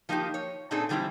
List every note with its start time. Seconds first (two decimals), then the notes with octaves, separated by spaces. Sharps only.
0.09 F3 A#3 D#4 F#4 G4
0.34 C#5
0.71 A#2 C4 D4 D#4 G#4 A4
0.89 D3 E3 G3 A3 C4 E4